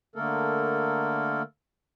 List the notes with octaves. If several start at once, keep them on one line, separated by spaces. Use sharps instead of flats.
D3 A3 A#3 A4 A#4